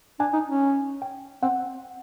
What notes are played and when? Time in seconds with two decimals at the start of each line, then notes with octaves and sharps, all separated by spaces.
0.19 D4 G#5
0.33 D#4
0.46 C#4
1.02 G5
1.42 C4 F#5